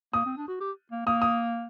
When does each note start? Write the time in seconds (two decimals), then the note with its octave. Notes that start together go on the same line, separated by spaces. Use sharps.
0.13 A#3 D#6
0.26 C4
0.37 D4
0.48 F#4
0.60 G4
0.91 A#3
1.06 A#3 D#6
1.22 D#6